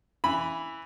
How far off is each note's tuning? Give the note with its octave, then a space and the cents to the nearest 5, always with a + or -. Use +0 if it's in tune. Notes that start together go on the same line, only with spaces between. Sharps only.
E3 +0 B5 +0